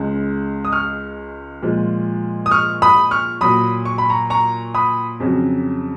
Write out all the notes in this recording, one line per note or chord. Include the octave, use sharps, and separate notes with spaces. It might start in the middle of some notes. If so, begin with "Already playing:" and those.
Already playing: C#2 C#3 G#3
D#6
C#6 F6
A#2 F3 G#3
D#6
C#6 F6
B5 D#6
C#6 F6
A#2 F#3 B5 D#6
C#6
B5
A#5 C#6
A#5 C#6
B5 D#6
F2 C#3 F#3